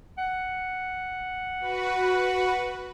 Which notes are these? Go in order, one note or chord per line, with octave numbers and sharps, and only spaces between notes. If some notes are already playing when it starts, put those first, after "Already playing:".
F#5
F#4 B4